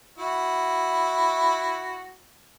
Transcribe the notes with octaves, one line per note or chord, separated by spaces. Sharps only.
E4 F#4